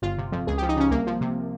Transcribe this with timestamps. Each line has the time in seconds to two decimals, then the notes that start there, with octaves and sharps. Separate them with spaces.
0.02 G1 F4
0.18 C3
0.32 F2
0.47 C#2 G#4
0.58 F3 G4
0.69 D#4
0.76 C#3 C#4
0.91 C2 A#3
1.07 F3
1.21 C3